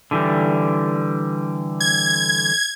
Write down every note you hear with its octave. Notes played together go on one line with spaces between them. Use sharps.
D3 E3 G3
G#6